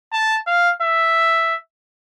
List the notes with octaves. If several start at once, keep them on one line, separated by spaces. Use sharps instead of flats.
A5
F5
E5